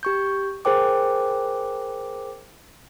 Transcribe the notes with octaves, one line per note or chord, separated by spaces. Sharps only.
G4 C#6 G6
G#4 A#4 C5 G5 D6